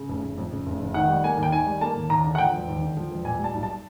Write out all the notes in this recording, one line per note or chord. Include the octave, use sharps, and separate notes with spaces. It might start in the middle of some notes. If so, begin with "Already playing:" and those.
Already playing: C#3
F1
F1
F2
C#3
F1
F1
D#3 F#5
G3
A#3 G#5
D#2
G5
D#3 G#5
G3
A#3 A5
D#2
D#2 A#5
D3
F#5
F3 G5
E1
D#2
D3
F3
E1
A#2 G#5
G3
A5
B1
A5